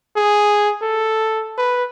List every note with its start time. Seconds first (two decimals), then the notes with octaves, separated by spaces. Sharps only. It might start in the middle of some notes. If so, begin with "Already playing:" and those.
0.17 G#4
0.82 A4
1.58 B4